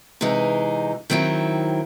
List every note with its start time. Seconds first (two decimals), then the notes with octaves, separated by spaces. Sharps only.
0.21 C3 E3 G#3 D#4
1.10 D#3 F#3 C4 E4